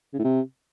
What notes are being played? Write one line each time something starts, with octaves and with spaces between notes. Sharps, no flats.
C#3
A2
C3